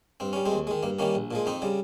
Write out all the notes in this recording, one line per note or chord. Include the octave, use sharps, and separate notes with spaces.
G2 C4
G3 C#4
G#3 C4
D#2
D#3 G#3
G2 A#3
D#3 G3 A#3 C#4
A#1
A#2 F3 G#3
F2 C4 D#4
C#3 G3